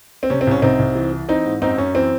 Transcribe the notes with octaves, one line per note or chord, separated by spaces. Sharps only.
C4
C3 C#4
C4
C2 C#4
C2 C4 D#4
C2
E3
E3
E3 C4 D#4
G#2
F#2 C4 D#4
F#2 C#4
E3 C4